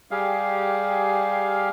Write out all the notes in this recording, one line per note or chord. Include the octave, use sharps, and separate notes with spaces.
G3 G4 G#4 F5